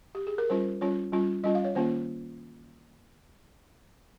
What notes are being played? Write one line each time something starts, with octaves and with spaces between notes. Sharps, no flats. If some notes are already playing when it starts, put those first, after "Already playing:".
G4
G#4
A#4
G3 C#4 F4 C5
G3 C#4 F4 C#5
G3 C#4 F4
G3 C#4 F4 D#5
F5
C#5
D#3 A#3 C#4 F4 C5